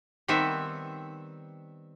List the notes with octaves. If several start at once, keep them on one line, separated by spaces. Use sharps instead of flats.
D#3 G3 B3 C4 E5